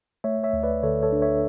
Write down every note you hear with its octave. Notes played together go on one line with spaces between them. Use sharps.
A3 C#5 E5
C#5 E5
D2
B4 D5
D3 A4 C#5
A4 C#5
D4
C#5 E5